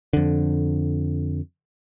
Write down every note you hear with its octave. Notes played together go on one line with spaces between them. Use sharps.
F2 D3